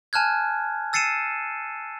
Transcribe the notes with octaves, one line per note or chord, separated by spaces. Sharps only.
G#5 A5 F6 F#6 G#6
E6 A6 C7 C#7 D#7 E7